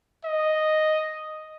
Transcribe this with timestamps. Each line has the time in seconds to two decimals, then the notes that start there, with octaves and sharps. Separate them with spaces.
0.25 D#5